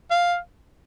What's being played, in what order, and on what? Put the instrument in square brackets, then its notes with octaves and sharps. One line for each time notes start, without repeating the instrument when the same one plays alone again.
[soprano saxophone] F5